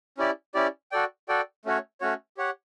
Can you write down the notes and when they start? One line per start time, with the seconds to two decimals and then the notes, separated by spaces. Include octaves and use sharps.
0.18 C#4 E4 G4 D5
0.54 C#4 E4 G4 D5
0.92 F#4 A4 D5 G5
1.29 F#4 A4 D5 G5
1.65 A3 C#4 F#4 C#5
2.01 A3 C#4 F#4 C#5
2.37 G4 C#5 F#5